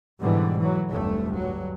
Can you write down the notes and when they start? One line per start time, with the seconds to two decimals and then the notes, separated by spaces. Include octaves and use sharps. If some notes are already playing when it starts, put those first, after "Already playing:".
0.19 G#2 B2 D3 E3 G3
0.58 E3 F#3
0.90 F1 D2 G2 A3
1.36 G2 F#3